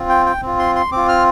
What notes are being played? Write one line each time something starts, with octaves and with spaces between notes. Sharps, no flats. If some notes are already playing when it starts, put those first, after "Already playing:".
Already playing: C4 F4
G5
G5
C4 F4
C6
C6
C4 F4 D6
F6